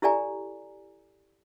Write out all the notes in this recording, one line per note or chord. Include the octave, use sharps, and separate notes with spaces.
E4 G4 A4 D5 G#5 A#5